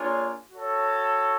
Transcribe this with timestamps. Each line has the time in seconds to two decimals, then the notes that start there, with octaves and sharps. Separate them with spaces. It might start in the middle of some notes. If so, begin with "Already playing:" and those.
Already playing: A#3 D4 F4 G#4 C#5
0.51 F#4 A4 C#5